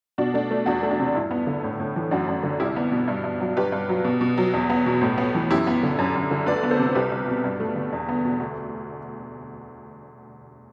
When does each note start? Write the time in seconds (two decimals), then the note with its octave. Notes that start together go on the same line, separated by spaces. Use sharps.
0.18 B2 D4 F#4
0.34 A3 D4
0.51 A3
0.66 E2 D4 F#4
0.83 A3
0.91 D4 F#4
0.99 C3
1.15 G2 E4
1.31 B3
1.47 D3
1.64 A2
1.80 A2
1.96 E3
2.11 F#2 D4 F#4
2.27 F#2
2.43 D3
2.59 C2 E4 G4
2.76 B3
2.92 B2
3.08 G2
3.24 G2
3.40 F#3
3.57 G2 G4 B4
3.72 G2
3.89 F#3
4.05 B2
4.21 B2
4.38 F#3
4.54 E2
4.70 B3
4.86 B2
5.02 A2
5.18 B3
5.35 E3
5.51 F#2 E4 G4
5.67 B3
5.83 D3
5.99 F#2
6.15 F#2
6.31 D3
6.46 D2 B4 D5
6.63 B3
6.71 A4 C5
6.79 C3
6.95 C2 G4 B4
7.12 C2
7.28 B2
7.44 G2
7.60 A3
7.75 D3
7.93 E2
8.09 B3
8.25 B2
8.40 D2